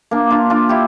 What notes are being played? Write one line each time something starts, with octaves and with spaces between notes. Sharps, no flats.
A#3 D4
D4 F4
D4 F4
E4 G4